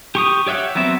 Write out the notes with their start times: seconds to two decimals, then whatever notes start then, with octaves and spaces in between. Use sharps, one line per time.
0.15 G4 C#6 D#6
0.46 G4 C#5 E5 F#5 G5
0.75 F#3 B3 C4 E5